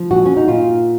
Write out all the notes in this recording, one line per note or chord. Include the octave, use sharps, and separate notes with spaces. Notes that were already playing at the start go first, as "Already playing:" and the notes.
Already playing: F3
A#2 F#4
C#4
D#4
A#2 F4